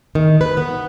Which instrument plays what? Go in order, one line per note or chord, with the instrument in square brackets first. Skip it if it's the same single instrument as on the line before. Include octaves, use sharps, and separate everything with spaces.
[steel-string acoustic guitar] D#3
B4
B3